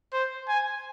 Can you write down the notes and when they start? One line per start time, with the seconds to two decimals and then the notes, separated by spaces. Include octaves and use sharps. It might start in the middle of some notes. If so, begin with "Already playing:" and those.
0.13 C5
0.49 G#5